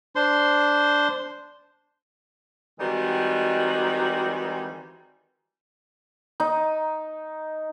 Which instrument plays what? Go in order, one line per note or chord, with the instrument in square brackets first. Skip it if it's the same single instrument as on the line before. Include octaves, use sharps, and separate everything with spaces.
[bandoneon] D4 C5 C6
[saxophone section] D#3 E3 G3 G#3 C4 F#4
[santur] D#4